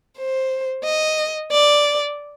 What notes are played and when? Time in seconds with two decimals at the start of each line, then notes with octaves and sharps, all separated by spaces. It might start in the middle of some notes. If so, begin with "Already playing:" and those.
0.18 C5
0.85 D#5
1.52 D5